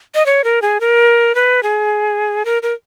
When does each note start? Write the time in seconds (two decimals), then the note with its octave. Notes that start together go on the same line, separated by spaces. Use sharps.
0.15 D#5
0.26 C#5
0.44 A#4
0.62 G#4
0.80 A#4
1.35 B4
1.63 G#4
2.45 A#4
2.63 A#4